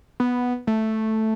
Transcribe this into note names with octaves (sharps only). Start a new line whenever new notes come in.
B3
A3